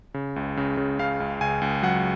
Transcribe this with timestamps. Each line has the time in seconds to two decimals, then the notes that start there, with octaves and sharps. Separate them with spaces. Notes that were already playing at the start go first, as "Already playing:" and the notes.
0.14 C#3
0.36 C#2
0.57 C#3
0.77 C#3
0.99 C#3 F5
1.20 C#2
1.41 C#2 G#5
1.62 C#2
1.83 F#3 F#5